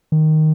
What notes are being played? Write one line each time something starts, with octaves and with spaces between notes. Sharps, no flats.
D#3